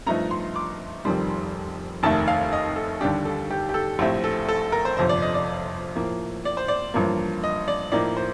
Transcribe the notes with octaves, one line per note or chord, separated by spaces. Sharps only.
G2 F3 A3 D#4 A#5
C6
D6
F1 F2 D#3 G3 C6
F1 D#2 D#3 A3 A5
F5
D#5
A4
D#2 D3 G3 D4 G4
A4
G4
G4
A4
A#1 A2 A3 C4 G4
A4
A4
A#4
C5
G1 F2 C3 C5
D5
D#5
D5
A2 F3 A#3
D5
C5
D5
A1 G2 F3 A#3
D#5
D5
A2 F3 A#3 D#4 D5
C5